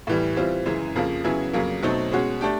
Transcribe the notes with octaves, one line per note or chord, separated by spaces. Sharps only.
A2 E3 G3
E3 G3 C4 F4
F#2 C#3 E3 G#3
F2 C#3 F3 A#3
C#3 F#3 B3 E4 G#4
F2 C#3 F#3 A#3
B2 F#3 A3 C4 D#4
B2 G#3 C#4 F#4
A3 D4 G4